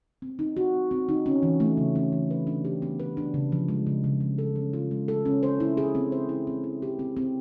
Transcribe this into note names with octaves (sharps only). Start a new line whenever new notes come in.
C4
D#4
F#4
C4
C4
D#4
C#4
E3
A3
C#3
C#4
E3
B4
D4
G4
B3
B4
D4
C#3
F3
G#3
C#3
C#3
F3
A4
C#4
F4
G#3
A4
C#4
C5
E4
G#4
C4
C5
E4
C4
E4
G4
C4
C4